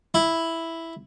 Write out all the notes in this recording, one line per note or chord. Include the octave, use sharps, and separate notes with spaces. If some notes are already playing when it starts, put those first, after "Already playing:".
E4